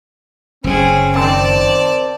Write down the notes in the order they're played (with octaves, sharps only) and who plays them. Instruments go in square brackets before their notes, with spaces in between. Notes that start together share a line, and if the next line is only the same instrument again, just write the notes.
[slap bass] F#1 C#3 [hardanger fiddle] C4 G#4 [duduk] C#4
[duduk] D#3 [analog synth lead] C4 [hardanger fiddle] D5 A5